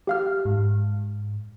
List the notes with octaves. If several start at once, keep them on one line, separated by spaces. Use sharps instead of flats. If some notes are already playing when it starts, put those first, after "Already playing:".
G4 F5 F6
G#2